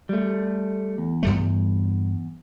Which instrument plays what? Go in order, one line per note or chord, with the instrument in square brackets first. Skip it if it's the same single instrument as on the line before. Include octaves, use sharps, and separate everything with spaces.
[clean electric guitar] G3 A3
E2
[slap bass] G2 G3 A3